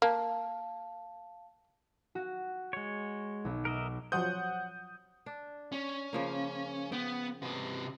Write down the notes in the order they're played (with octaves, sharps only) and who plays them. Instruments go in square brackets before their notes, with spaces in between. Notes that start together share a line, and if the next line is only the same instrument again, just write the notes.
[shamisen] A#3 [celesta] F5 A5
[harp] F#4
[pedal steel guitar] G#3 C#5
[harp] B1
[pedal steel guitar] A#4 D#5 E5
[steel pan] F3 F#3 C5 [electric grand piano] F#5 D#6 G6
[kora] D4
[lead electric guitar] C#4
[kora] C#3 F3 A#3
[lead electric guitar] B3 [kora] G5
[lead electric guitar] C3 B4